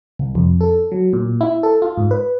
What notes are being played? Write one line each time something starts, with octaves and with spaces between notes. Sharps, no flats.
C2
F2
A4
F#3
A#2
E4
A4
F4
G#2
B4